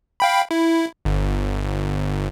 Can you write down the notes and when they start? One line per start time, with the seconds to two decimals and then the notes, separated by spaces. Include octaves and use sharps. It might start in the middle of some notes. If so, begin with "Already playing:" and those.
0.20 F5 G5 B5
0.51 E4
1.05 G1